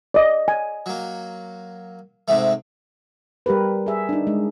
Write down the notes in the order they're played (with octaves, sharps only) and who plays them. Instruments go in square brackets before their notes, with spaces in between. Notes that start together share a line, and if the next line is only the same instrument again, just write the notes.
[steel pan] D5 D#5
G#5
[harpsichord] F#3 A#3
G#2 C3 A3
[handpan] G3 G4 A#4 B4
G#4 E5
D4 D#4
G#3